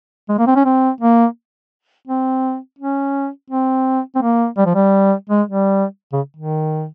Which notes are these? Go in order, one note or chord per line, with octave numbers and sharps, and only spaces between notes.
G#3
A#3
C4
C#4
C4
A#3
C4
C#4
C4
C4
A#3
G3
F3
G3
G#3
G3
C#3
D#3